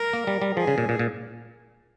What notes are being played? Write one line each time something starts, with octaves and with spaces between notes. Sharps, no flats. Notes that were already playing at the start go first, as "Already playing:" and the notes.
Already playing: A#4
A#3
G3
G3
F3 G#4
C#3
A#2
A#2
A#2